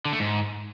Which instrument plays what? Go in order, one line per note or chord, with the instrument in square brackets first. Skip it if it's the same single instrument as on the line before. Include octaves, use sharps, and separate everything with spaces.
[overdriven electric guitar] D3
A3
G#2